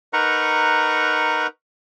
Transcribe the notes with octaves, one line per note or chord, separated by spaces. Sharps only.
D#4 A#4 B4 F#5 A#5 C#6